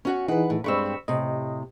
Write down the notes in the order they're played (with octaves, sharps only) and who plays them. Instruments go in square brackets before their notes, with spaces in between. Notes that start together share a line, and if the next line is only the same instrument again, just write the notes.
[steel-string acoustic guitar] C#4 F#4 F#5
[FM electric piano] E3 D#4 G#4 [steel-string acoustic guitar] B4 F#5
[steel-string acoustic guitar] A2
[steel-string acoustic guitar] G2 G#3 C4 [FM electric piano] B5 C#6 E6
[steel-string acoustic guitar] A2 C3 [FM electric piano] D#5